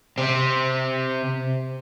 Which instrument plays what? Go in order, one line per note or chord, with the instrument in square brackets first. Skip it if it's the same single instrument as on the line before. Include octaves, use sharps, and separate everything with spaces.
[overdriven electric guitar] C3 C4